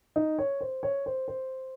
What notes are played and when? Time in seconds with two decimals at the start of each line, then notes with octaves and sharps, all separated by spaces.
0.16 D#4
0.39 C#5
0.61 C5
0.83 C#5
1.06 C5
1.28 C5